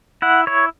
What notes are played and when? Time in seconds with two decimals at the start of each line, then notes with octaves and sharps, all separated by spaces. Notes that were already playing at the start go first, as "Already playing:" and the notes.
0.22 E4 F#5
0.47 E4 C#5